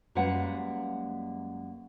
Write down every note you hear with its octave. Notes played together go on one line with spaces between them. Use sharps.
F#2 G3 G#3 A#3 B4 F#5